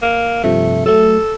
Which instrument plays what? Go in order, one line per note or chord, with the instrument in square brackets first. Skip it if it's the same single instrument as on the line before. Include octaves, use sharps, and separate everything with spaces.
[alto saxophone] A#3
[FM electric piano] G2 C3 F3 [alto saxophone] A3
[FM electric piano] F#3 A3 [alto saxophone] A4